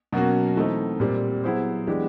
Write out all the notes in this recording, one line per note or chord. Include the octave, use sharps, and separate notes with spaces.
B2 F#3 A#3 C#4 F#4
E3 A3 C4 D#4
A#2 G3 C4
F#3 B3 E4 G#4 C5
E3 G#3 B3 D4 G4